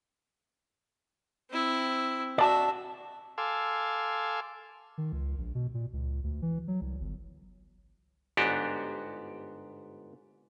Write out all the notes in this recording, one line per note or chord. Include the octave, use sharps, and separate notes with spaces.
C4 E4
F#4 D5 E5 A5
A4 F5 G#5 C6 D6 E6
D#3
C#2
A#1
B2
A#2
C#2
D2
E3
F#3
C2
G1
G1 G#2 B3 D4 F#4 G4